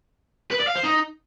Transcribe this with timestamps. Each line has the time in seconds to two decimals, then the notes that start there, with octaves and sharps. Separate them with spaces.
0.51 B4
0.59 D5
0.67 F5
0.76 C5
0.84 D#4